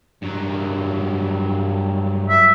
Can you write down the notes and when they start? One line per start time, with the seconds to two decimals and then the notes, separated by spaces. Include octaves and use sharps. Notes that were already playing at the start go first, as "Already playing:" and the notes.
0.22 G2 F#3
2.29 E5